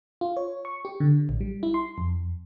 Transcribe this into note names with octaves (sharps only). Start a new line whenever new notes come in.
F4
C#5
C#6
G4
D3
A1
G3
E4
C6
F2